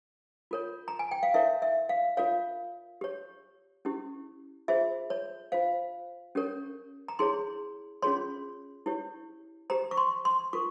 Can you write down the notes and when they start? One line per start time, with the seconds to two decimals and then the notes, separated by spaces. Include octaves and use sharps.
0.51 F4 A#4 C#5
0.88 A#5
0.99 G#5
1.11 G5
1.23 F5
1.34 E4 A#4 C#5 E5
1.62 E5
1.89 F5
2.17 F4 A#4 C#5 F5
3.01 G4 C#5
3.85 C#4 E4 G4
4.68 F4 G#4 C5 E5
5.10 C#5
5.52 F4 C5 F5
6.35 C#4 G4 A#4 C#5
7.08 A#5
7.19 E4 G#4 C#5 C6
8.02 C#4 F4 G#4 C#5 C6
8.86 E4 G4 C#5
9.70 G4 C5 A#5
9.91 C#6
9.97 C6
10.25 C6
10.53 F4 A#4 C#6